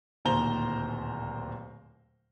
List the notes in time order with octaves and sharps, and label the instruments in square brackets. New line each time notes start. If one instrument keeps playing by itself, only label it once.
[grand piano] D1 D#2 A#2 C5 A#5 G7